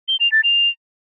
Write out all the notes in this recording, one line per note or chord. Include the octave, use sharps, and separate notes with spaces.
G7
F7
A6
F7